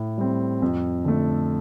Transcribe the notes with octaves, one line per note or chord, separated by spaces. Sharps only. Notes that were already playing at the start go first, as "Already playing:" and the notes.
Already playing: A2
G3 C4
F2
D3 A3